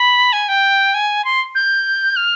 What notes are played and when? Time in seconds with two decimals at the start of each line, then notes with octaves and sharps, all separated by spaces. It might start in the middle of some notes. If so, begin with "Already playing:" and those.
Already playing: B5
0.33 G#5
0.48 G5
0.94 G#5
1.25 C6
1.55 G6
2.16 F6